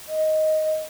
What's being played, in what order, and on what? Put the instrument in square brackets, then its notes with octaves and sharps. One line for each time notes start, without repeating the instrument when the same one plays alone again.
[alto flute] D#5